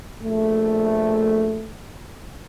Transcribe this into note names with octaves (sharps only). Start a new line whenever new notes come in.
A#1 A3